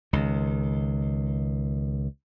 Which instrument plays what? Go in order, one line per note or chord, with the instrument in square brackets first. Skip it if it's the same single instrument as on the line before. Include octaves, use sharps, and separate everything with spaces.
[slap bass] C#2 D#3